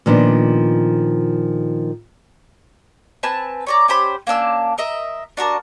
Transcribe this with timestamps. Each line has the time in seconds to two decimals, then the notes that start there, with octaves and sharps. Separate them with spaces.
0.06 A#2 D#3 F3 B3 D4
3.23 C4 B4 G#5 A5
3.67 C#5 D5 A#5
3.88 C#4 G4 C5 B5
4.27 A#3 C#4 D4 E6
4.78 A#4 D#5 E5
5.37 D4 F#4 A#4 A5